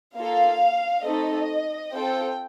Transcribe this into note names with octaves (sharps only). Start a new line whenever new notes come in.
A#3 F4 A4 F5
A3 C4 D#4 A4 D#5
C4 F4 A4 G5